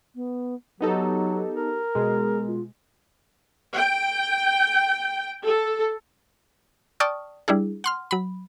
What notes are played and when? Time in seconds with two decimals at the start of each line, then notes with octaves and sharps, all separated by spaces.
0.15 B3
0.81 F#3 B3 D#4 G4 A4
1.54 A#4
1.95 B2 G#3 G#4
2.47 F4
3.76 G5
5.44 A4
7.00 D5 G5 A5 C#6 D#6 F6
7.48 G3 D4 E4 G#4
7.84 F#5 C6 F6
8.11 F#3 B5